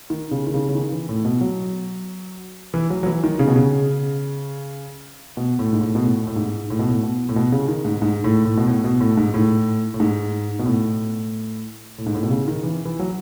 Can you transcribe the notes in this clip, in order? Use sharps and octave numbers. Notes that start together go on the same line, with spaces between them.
D#3
C#3
D#3
C#3
C#3
D#3
E3
A2
B2
F#3
E3
F#3
F#3
E3
D#3
C#3
B2
C#3
B2
A2
G#2
A2
B2
A2
A2
G#2
A2
B2
A2
B2
A2
B2
C#3
D#3
G#2
G#2
A2
A2
B2
A2
B2
A2
G#2
A2
A2
G#2
B2
A2
A2
G#2
A2
B2
C#3
D#3
E3
E3
F#3